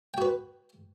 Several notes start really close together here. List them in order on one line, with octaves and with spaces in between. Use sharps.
G5 F#4 B4